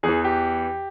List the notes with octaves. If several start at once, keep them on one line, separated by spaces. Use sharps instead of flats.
E2 E3 G#4
G4